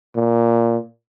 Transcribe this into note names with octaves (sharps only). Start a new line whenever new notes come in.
A#2